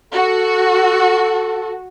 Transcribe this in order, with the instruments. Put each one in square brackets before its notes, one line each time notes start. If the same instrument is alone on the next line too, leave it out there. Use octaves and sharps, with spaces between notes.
[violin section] F#4 [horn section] A4